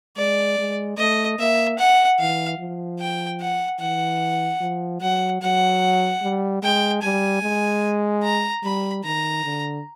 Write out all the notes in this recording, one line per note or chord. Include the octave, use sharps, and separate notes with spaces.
G#3 D5
G#3
A3 D#5
A#3 E5
F#5
E3 F5
F3
G5
F#5
E3 F#5
F3
F#3 F#5
F#3 F#5
G3
G#3 G5
G3 G#5
G#3
A#5
G3 B5
D#3 A#5
D3